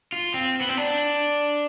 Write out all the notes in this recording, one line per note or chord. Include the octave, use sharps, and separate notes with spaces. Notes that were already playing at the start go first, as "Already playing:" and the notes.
F4
C4
B3
C4
D4